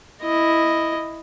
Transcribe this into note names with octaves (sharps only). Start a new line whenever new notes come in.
E4 D#5